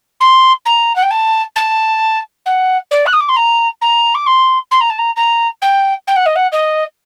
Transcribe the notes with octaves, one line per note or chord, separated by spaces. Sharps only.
C6
A#5
F#5
G5
A5
A5
F#5
D5
F#6
D#6
D6
C6
A#5
A#5
D6
C6
C6
A#5
A5
A#5
A#5
G5
G5
F#5
D#5
F#5
D#5